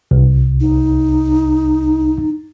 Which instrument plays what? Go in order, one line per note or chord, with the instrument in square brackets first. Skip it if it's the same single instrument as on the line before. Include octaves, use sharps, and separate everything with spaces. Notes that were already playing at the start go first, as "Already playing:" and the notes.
[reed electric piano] C2
[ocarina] D#4